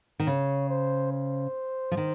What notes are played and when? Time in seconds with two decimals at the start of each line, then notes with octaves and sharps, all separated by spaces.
0.19 D#3
0.27 C#3 C#5
0.69 C5
1.12 C5
1.91 F3
1.97 D#3